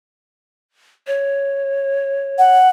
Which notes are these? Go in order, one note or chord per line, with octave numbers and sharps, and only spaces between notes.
C#5
F#5